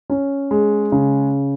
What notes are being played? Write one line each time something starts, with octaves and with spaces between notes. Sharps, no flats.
C#4
G#3
C#3